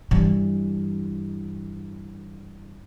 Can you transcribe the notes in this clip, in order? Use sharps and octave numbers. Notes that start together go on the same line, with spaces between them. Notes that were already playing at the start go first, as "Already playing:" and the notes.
G2 E3